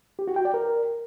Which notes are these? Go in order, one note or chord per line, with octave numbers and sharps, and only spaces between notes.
G4
F#4
G5
D5
A#4